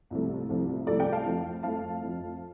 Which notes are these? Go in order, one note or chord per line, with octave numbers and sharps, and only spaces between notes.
C2 C3 F3 A3
C2 C3 F3 A3
C2 C3 F3 A3 A4 D5
D5 G5
F5 A5
F2 F3 A3
F2 F3 A3 F5 A5
F2 F3 A3